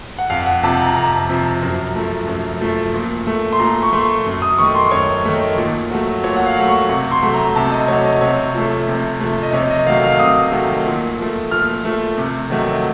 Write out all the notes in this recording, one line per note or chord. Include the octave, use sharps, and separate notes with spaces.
F#5
F2 F5
F#5
C3 F3 A5
A#5
F2 A#5
C3 F3
F#2
F3 A3
F#2
F3 A3
A#2
A3
C6
A#2 A#5
C#6
A3 C6
F#2
D#6
D#3 A3 C#6
C6
F#2 C#5
D#3 A3
A#2
F#3 A3
A#2 C#5
F#5
F5
F#3 A3
C#6
C3 C#6
C6
F#3 A3
A#5
C3 A5
D#5
F#3 A3 C#5
D#5
C3 C#5
F3 A3
C3
F3 A3
D#5
C3 C#5
D#5
D#3 F#3 A3 F5
F5
C3 D#6
D#3 F#3 A3
A#2
F3 A3
A#2 F6
F3 A3
C3
D#3 F#3 A3